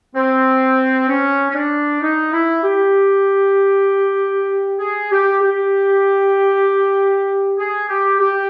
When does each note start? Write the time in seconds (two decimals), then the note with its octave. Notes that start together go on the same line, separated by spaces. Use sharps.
0.15 C4
1.08 C#4
1.50 C#4
1.54 D4
2.01 D#4
2.32 E4
2.63 G4
4.79 G#4
5.11 G4
5.42 G4
7.58 G#4
7.89 G4
8.19 G4